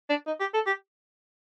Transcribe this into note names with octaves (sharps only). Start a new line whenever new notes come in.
D4
D#4
G4
A4
G4